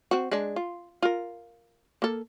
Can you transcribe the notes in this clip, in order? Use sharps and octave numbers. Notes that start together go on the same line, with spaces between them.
C4 F#4
G#3 D4
F4
F4 A#4
A#3 A4